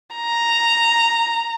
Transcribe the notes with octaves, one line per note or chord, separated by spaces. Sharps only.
A#5